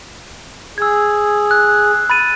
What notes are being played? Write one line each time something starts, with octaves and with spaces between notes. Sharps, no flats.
G#4 E6 G#6
F#6
B5 A6 D#7